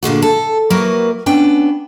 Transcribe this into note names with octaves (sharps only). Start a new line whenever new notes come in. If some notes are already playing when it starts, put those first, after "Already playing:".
A#2 D3 G#3 F#4
A4
F#3 A#3 E4 F#4 A#4 B4
B3 C#4 D4 G5